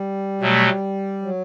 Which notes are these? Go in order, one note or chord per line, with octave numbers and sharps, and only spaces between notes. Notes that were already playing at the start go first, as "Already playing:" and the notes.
Already playing: G3
B2 F#3 A3
F#3